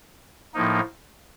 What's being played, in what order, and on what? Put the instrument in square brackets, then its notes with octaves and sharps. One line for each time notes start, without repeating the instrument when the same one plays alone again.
[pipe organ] A2 F3 A#3 D#4